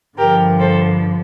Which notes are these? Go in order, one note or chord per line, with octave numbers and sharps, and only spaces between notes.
G2 D3 F3 G4 A#4
A4 C5